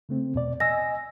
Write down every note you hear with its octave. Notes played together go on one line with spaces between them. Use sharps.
C#3 A3 C4
E2 B2 D5
D#5 G#5 E6 A#6